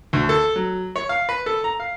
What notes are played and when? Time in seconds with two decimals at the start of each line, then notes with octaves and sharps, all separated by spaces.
0.13 D2
0.29 A4
0.56 F#3
0.96 C#5
1.09 F5
1.29 B4
1.46 A4
1.64 A#5
1.80 F5